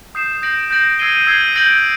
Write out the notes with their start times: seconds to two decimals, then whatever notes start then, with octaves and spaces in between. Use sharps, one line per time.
0.15 D#6 G6 C7 E7
0.42 G6 A#6 D7 F#7
0.71 G6 A#6 D7 F#7
0.99 E6 G#6 C7 D#7 G7
1.27 E6 G#6 C7 D#7 G7
1.55 G6 A#6 D7 F#7